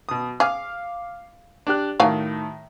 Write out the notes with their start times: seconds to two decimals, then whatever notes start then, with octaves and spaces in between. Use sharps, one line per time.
0.09 B2 D#6
0.40 G#4 F5 D6 F6
1.67 D4 G4 F#6
2.00 A2 D#3 F#3 F5 G#5